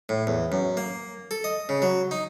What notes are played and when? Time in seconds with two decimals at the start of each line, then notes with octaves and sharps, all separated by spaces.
0.09 A2
0.27 E2
0.52 F#2
0.77 A#3
1.31 A4
1.44 D#5
1.69 C#3
1.82 F#3
2.11 D#4